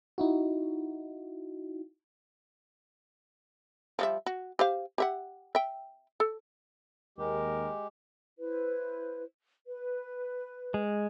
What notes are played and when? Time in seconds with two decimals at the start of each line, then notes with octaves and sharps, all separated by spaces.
0.18 D#4 E4 F#4
3.99 F3 G3 E5
4.26 F#4
4.59 G4 C5 F5
4.98 G4 E5 F#5
5.55 E5 G5
6.20 A4
7.18 D#2 G#3 G4 A#4
8.38 E4 B4 C5
9.67 B4
10.74 G#3